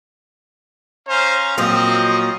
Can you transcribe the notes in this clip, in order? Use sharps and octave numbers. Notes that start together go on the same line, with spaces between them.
C#4 C5 F5 A#5
A#2 F3 F#3 C4 D#5